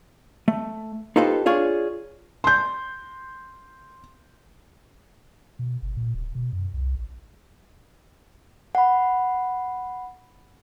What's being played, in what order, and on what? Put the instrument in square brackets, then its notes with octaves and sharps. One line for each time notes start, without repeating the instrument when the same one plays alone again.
[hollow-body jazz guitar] A3
D#4 F4 G4 A4 B4 C5
D4 F4 G#4 C#5
[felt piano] C6 G6
[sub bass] B2
G1
A#2
D1
B2
F#2
C2
A1
[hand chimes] F#5 B5